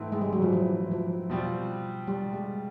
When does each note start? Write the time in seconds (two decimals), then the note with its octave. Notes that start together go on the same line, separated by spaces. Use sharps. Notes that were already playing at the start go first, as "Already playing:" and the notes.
Already playing: G#2 E3 A3 C4 E4
0.12 G#3
0.21 G3
0.33 F#3
0.42 F3
0.53 E3
0.91 F3
1.30 B2 G3 C4 F4
2.08 G3
2.33 G#3